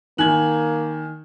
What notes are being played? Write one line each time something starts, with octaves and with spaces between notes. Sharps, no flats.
D#3 A#3 G#5 F#6 G#6 F#7